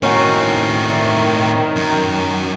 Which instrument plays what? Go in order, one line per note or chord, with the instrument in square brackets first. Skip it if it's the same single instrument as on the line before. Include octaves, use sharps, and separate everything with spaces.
[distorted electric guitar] A2 C4 [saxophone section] D#3 [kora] C#4 D#4 F#4
[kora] C#5 D5 E5
[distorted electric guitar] F#2